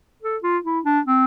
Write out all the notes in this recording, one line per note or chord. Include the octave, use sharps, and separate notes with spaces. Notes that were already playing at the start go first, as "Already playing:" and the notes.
A4
F4
E4
D4
C4